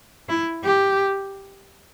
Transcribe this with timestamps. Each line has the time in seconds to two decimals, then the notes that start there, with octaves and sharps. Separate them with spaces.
0.29 E4
0.64 G4